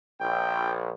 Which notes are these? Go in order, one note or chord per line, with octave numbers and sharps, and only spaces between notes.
A#1 G5